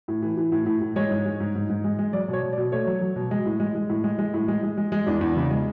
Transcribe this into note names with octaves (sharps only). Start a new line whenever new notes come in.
A2
E3
E3
A2
A2
A2
G#3 C#5
G#2
G#3
G#2
G#2
G#2
G#3
G#3
F#3 D5
B2 C#5
B2
D5
B2
A3 C#5
F#3
F#3
B2
G#3
A2
G#3
G#3
A2
G#3
G#3
A2
G#3
G#3
G#3
G#3
E2 D4
E2
C#3
G#3